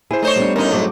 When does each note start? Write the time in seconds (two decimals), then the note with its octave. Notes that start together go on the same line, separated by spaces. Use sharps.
0.11 E4 G#4 C5
0.22 A3 D#4 C5 C#5
0.36 G3 B3 D4
0.56 A2 C#4 D#4 A#4
0.71 G2 F#3 A3 C4 G#4 D6